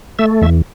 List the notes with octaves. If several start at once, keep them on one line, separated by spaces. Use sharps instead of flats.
A3 E5
E2 E5